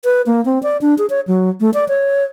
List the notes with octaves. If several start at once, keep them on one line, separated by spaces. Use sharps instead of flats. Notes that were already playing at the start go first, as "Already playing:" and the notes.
B4
A#3
C4
D5
D4
G#4
C#5
F#3
A3
D5
C#5